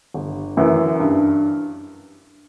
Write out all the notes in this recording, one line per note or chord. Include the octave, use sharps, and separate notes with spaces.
G1
F#2 E3
G2